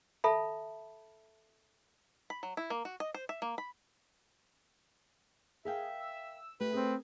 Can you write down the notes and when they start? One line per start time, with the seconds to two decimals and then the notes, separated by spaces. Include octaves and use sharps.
0.24 A4 E5 A5 B5
2.30 B5
2.43 F#3
2.57 E4
2.70 A#3
2.85 F#4
3.00 D#5
3.14 C5
3.29 E5
3.42 A#3
3.58 B5
5.65 G#4 A#4 E5 F5 G5
6.00 E6
6.61 A3 G4 B4
6.73 C4 G#4 A#4